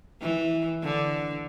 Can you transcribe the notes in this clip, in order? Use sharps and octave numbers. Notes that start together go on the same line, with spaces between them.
E3
D3